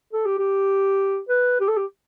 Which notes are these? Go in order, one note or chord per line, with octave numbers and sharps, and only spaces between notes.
A4
G4
G4
B4
G4
A4
G4